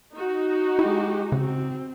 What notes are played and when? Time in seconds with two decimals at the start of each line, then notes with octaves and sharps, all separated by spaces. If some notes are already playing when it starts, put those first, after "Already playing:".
0.15 D#4 F#4
0.79 G#3 E4 G4
1.32 C#3 C4